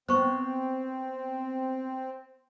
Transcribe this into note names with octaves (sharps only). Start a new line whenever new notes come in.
B3 C4 C5 C#6